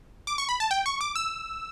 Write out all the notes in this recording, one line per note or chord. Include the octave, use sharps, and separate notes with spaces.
D6
C#6
B5
A5
G5
C#6
D6
E6